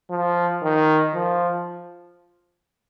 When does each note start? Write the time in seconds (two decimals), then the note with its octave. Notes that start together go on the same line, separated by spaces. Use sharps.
0.10 F3
0.62 D#3
1.14 F3